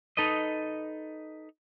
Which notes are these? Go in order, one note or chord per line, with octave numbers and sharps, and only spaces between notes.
D#4 A4 B4 D#5